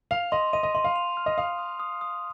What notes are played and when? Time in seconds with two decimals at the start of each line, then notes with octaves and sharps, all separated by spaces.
0.11 F5 F7
0.32 D#5 C6
0.53 D#5 D#7
0.63 D#5
0.75 D#5 C6
0.84 F5
0.96 F7
1.17 F6
1.26 D#5
1.38 F5 D#6
1.59 D#6
1.80 D#6
2.01 D#6